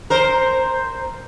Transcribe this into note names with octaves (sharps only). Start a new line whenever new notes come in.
A#4 C5